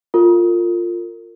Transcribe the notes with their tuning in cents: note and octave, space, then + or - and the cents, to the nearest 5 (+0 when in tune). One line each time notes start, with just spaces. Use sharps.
F4 +0 A#4 -40